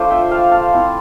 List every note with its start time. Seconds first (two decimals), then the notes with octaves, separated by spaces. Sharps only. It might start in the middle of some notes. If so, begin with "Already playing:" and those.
Already playing: A3 D4 F4 C5
0.10 E5 G5
0.31 F5 A5
0.51 F5 A5
0.72 A3 C4 E4